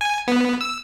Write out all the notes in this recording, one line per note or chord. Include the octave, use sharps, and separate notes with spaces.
G#5
B3
E6